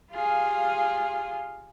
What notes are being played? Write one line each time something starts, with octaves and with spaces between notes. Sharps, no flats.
F4 G4 G#4 F5